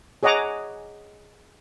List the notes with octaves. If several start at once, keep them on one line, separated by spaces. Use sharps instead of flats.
G#4 C#5 D#5 F#5 A#5 D6